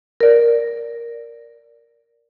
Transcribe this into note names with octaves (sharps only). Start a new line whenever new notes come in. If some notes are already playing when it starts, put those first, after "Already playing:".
A#4 D5